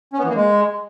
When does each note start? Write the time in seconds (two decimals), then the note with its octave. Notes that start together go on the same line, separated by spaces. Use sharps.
0.13 C#4
0.19 B3
0.24 E3
0.30 A#3
0.35 G#3